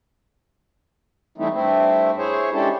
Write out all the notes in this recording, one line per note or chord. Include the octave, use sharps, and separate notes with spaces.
E3 G3 A3 C4 D#4 E4
G2 A3 C4 E4
E4 G#4 C5 C#5
G#3 C#4 D4 E4 G4 A4